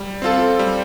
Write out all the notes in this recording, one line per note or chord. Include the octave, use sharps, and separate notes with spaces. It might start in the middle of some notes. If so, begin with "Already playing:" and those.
Already playing: G3
C4 F4 A4
G3